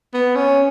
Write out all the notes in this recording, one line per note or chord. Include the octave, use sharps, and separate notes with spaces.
B3
C#4